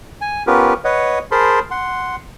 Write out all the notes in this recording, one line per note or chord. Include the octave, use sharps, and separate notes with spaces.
G#5
B3 C#4 F4 G4 A#4 B4
B4 C#5 D#5 F#5
G#4 A#4 C5 A5 B5 C6
F#5 C6